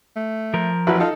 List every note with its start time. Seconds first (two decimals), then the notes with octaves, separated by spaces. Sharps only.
0.16 A3
0.54 F3 A#4
0.87 A1 F#3 E4 B4
1.00 D#4 F4 A4